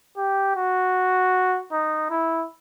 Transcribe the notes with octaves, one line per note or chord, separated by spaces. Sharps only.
G4
F#4
D#4
E4